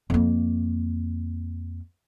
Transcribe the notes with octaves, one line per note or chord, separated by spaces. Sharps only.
F2 A#3